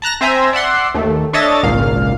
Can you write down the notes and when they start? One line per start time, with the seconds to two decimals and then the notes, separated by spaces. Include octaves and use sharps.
0.02 A5 A#5 F#6 A#6
0.21 C4 C5 E5 G#5 A#5
0.53 D5 E5 F#5 C6
0.94 D#2 A3
1.33 D4 A4 C#5 D#5 E5 A6
1.63 G#1 C#2 A#2 F5